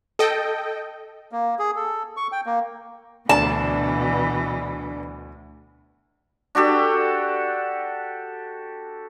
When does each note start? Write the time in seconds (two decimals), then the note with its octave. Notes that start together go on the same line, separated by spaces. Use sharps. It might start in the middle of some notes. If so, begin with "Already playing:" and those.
0.19 A4 D#5 G5
1.32 A#3
1.59 G#4
1.76 A4
2.17 C#6
2.32 G5
2.46 A#3
3.29 D2 B2 E3 D4 A5
6.55 D4 F#4 G4 A4